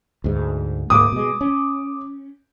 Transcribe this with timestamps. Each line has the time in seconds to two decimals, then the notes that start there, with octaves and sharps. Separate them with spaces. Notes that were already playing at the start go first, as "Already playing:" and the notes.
0.24 D2 G#2
0.90 D2 G#2 A#3 D6 D#6
1.12 B2 G#3
1.41 C#4